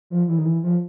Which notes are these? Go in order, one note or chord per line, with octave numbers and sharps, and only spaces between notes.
F3
E3
D#3
E3
F3